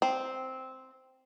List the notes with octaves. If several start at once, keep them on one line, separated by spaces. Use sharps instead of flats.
C4